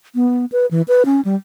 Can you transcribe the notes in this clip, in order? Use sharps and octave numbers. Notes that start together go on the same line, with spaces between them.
B3
B4
E3
B4
C#4
G3